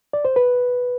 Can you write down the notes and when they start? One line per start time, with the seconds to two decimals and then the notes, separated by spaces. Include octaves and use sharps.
0.13 D5
0.25 C5
0.36 B4